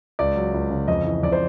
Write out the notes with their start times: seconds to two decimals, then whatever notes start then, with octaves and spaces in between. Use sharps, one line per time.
0.19 C#2 D5
0.36 F#3
0.54 C#2
0.70 C#3
0.88 F2 D#5
1.05 E3
1.23 F2 D5
1.32 C5